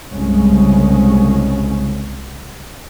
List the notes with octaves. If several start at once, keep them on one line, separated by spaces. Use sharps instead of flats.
C2 G2 C#3 G#3 C#4